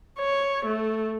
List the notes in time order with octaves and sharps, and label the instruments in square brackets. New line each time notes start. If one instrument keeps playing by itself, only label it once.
[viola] C#5
A3